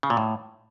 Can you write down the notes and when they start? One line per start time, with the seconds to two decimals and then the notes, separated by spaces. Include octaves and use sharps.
0.03 C#3
0.10 A#2
0.17 A2